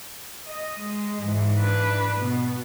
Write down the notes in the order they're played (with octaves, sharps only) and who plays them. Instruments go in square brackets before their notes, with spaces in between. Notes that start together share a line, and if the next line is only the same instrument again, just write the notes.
[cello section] D#5
[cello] G#3
[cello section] G#2 E3
[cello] D4 B4
[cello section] B2 [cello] B3